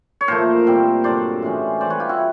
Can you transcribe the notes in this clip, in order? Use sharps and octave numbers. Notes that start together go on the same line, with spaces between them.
C#5
A#2 F3 A3 A#4 C5
A#2 G3 C4
G2 D3 F#3 C5 D5
A2 E3 G#3 C#4
E3 G3 C4 C5 D5
B4 C#5
F4 G4
E4 F#4